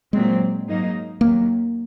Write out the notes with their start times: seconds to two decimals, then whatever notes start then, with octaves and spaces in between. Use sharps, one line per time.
0.13 A#2 F#3 G#3 C4
0.67 G#2 F#3 A#3 D#4
1.21 D#2 D#3 F#3 A#3